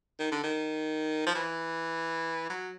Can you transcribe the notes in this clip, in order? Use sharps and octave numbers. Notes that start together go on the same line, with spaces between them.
D#3
D3
D#3
F3
E3
F#3